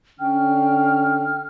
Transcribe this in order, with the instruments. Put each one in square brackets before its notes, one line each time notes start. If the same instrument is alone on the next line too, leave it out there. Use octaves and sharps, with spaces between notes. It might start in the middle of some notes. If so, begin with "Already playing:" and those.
[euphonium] D3 [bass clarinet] C#4 [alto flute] G5 [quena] F6